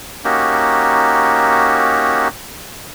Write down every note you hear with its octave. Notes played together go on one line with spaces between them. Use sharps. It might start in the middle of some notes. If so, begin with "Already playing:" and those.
A#3 C#4 D#4 F#4 G4